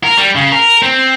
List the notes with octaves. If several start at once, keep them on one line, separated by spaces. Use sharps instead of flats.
A#4
G3
C#3
A#4
C4